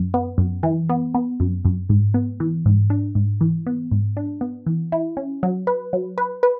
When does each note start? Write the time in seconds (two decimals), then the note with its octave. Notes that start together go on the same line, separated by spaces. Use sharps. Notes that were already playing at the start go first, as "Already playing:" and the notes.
Already playing: F#2
0.14 B3
0.38 F#2
0.63 E3
0.89 B3
1.14 B3
1.40 F#2
1.65 F#2
1.89 G#2
2.14 B3
2.40 E3
2.66 G#2
2.90 D4
3.15 G#2
3.41 E3
3.67 B3
3.91 G#2
4.17 D4
4.41 B3
4.66 E3
4.92 E4
5.17 C#4
5.43 F#3
5.67 B4
5.93 F#3
6.18 B4
6.43 B4